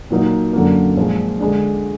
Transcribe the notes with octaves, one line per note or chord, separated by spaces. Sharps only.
A#2 F#3 A#3 D#4
F#2 D3 F#3 A#3
A#2 F3 G#3
D3 G#3 D4